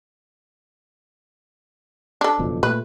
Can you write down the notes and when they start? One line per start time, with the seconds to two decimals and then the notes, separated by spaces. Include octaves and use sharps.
2.21 D4 A4
2.39 F#1 F2 B2
2.63 A#2 A3 B4